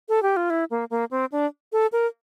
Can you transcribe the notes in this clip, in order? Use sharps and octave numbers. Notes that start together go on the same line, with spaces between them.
A4
G4
F4
E4
A#3
A#3
C4
D4
A4
A#4